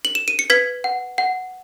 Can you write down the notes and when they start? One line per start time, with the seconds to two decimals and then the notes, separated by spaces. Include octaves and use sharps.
0.05 F#7
0.15 E7
0.28 D#7
0.39 C#7
0.50 B4 G#6 B6
0.84 F#5
1.18 F#5